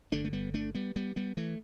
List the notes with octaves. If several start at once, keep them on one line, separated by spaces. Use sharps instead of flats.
G1 G2 D3 A3 D4
A3
G3 B3
A3 D4
G3 B3
G3 B3
G3 B3
E3 A3